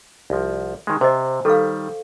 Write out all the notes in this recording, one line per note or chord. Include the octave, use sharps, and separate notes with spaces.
C2 F3
D#3 G#3
C3 C5 D#5
D#3 G3 A4 F5